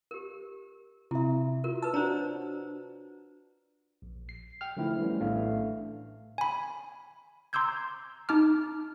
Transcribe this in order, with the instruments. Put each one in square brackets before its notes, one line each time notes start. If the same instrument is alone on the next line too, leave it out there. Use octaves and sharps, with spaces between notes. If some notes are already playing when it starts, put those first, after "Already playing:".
[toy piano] G4 A#4
[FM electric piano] C3 [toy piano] E4 E5
[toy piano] F4 F#4 A#4
[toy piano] B4 E6 [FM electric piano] A5
[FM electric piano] D4 F#4 [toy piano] C5 C#5 A#5
[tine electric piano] A#1
C7
G5 F6
D3 E3 F3 A3 E4
E3 G3 A3 B3 C#4
A#1 A2 A3 D4 F5
[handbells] G#5 B5
A#5 C6 D6 E6 G6 G#6
D#4 A5 D6 F6